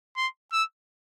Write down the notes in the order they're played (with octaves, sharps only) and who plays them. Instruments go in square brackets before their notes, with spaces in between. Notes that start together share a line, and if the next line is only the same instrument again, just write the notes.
[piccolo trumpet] C6
E6